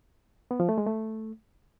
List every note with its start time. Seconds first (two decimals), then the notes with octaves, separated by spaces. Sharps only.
0.51 B3
0.60 F3
0.69 A3
0.78 G#3
0.87 A3